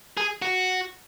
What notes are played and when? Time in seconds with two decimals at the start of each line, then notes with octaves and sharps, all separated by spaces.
0.17 G#4
0.42 F#4